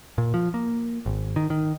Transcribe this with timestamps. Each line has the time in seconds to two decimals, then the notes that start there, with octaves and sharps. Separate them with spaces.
0.18 A#2
0.34 F3
0.54 A#3
1.06 G#1
1.36 D#3
1.50 D#3